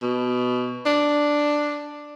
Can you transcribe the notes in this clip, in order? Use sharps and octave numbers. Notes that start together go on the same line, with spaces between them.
B2
D4